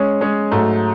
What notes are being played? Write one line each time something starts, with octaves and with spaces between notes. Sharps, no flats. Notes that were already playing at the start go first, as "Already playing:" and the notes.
Already playing: G#3 C#4 G#4 C#5
G#3 C#4 G#4 C#5
G#2 F#3 A3